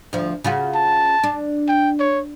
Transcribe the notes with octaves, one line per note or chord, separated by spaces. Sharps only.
D2 F3
C#3 F4 F#4
A5
D4
G5
C#5